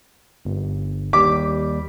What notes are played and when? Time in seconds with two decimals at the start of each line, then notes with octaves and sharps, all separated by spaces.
0.45 G1
1.13 D#2 G3 D6 B6